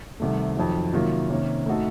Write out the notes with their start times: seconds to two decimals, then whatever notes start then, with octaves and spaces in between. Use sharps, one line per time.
0.20 C2 C3 D#3 A3
0.56 F2 D#3 F#3
0.93 C3 D#3 F#3 A#3 F4
1.30 C3 D#3 A#3 C#4
1.66 A2 A3 D#4 F#4 A4